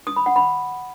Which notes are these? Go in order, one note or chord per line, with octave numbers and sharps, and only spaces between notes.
D#6
B5
F#5
B5